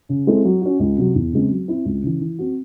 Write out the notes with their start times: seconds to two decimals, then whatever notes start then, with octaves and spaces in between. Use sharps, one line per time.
0.09 C#3
0.27 G#3 C4 E4 A4
0.45 F#3
0.62 C#4 F#4
0.80 C#2
0.98 C3 F#3
1.15 E2
1.33 C#3 G#3 C4
1.51 F#3
1.68 C4 E4
1.86 C#2
2.03 C#3 E3
2.21 E3
2.39 C4 F#4